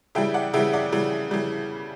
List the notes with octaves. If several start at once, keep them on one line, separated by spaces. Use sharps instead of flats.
C#3 E3 G3 E5 G5
D5 F#5
C#3 E3 G3 E5 G5
D5 F#5
C#3 E3 G3
C#3 E3 G3